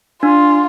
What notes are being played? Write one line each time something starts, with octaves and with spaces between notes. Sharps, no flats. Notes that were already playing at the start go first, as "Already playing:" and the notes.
D4 F4